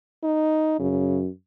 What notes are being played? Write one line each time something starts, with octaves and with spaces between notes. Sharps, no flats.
D#4
F#2 C#3